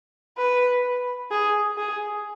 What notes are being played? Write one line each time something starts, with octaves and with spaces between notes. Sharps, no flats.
B4
G#4
G#4